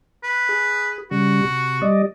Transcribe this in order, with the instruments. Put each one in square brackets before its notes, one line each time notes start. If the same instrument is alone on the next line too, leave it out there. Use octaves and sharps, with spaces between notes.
[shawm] B4
[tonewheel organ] G#4
[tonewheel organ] C#3 G3 [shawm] F#4
[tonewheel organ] C3
G3 D5 D#5